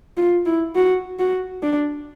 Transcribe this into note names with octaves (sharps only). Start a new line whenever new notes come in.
F4
E4
F#4
F#4
D4